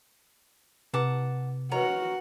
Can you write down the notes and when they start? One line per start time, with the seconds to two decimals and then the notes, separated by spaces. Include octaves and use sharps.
0.94 C3 E4 G4 B4 F#5 A5 D6
1.71 F#4 A#4 B4 C#5 D#5 F#5 A#5